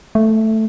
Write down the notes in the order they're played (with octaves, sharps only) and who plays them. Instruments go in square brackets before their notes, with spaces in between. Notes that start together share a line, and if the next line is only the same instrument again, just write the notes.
[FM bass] A3